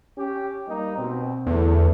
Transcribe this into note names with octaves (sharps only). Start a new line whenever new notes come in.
C#4 G4
G3 A#3 D#4
B2 C4
E2 D3 E3 A3